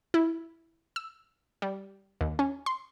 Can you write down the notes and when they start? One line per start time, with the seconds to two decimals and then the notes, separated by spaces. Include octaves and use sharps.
0.14 E4
0.96 E6
1.62 G3
2.21 D#2
2.39 C#4
2.66 C6